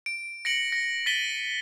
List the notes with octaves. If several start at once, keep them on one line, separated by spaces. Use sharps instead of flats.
D7
A#6 C#7 D7 F#7
A#6 C#7
A6 B6 D#7 G7